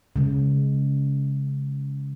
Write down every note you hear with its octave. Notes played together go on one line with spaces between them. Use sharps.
C#3 G#3